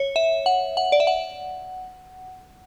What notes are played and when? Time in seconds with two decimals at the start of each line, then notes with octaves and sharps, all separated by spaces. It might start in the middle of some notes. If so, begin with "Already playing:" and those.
Already playing: C#5
0.16 E5
0.46 F#5
0.77 F#5
0.92 D5
1.00 E5
1.07 F#5